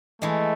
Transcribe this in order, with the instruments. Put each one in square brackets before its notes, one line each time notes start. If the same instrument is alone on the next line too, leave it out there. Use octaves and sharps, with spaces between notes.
[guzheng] E3 G#3 [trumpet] A3